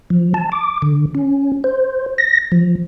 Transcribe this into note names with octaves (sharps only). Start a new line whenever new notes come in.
F3
A5
D6
D3
C#4
C5
A#6
F3